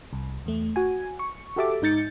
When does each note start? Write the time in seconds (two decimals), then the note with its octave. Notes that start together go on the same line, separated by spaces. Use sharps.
0.13 C2
0.46 E2 A3
0.76 F#4 G#5
1.19 C#6
1.56 F#4 G4 A4 E5 A5 D6
1.82 G#2 D#4 G6 A6 C#7